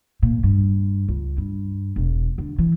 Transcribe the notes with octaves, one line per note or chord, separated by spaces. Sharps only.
A#2
G2
C#2
G2
E1
D3
E3